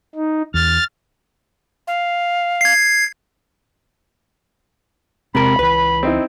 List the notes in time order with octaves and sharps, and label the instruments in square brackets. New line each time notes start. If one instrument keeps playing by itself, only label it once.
[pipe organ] D#4
[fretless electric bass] E2 [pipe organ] F6 A6
[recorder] F5
[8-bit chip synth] G#6 C7
[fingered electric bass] E1 G#3 [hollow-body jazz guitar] C3 A#4 [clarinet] B5
[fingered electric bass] C#2 E3 [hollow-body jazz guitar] B4
[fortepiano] C4 D#4 E4